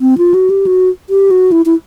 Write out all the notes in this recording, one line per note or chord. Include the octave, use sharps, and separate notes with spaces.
C4
F4
F#4
G4
F#4
G4
F#4
E4
E4